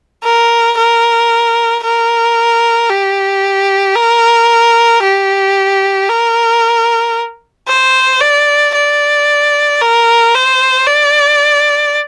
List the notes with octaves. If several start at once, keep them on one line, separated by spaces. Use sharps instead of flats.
A#4
A#4
A#4
G4
A#4
G4
A#4
C5
D5
D5
A#4
C5
D5